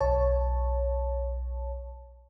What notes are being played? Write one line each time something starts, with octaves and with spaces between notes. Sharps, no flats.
B1 C#5 A5